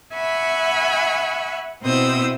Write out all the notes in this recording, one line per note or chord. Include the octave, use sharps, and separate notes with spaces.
E5 F#5 G#5 B5 C#6
B2 C4 E4 C5 D#6 E6